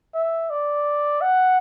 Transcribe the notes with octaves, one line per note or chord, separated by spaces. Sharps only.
E5
D5
F#5